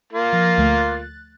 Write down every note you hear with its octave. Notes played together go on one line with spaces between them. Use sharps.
A#3 F4
F3 A#6
D2 A3
F#6 A6